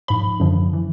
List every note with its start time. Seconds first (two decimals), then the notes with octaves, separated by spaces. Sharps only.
0.08 G#2 F3 B5
0.40 F#2 D3 F3
0.73 E3